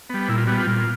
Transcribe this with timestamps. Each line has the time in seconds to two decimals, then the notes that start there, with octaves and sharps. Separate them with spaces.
0.10 G3 B3
0.28 A#2 E4
0.38 F4
0.47 G3 B3 F#4
0.57 F4
0.67 A#2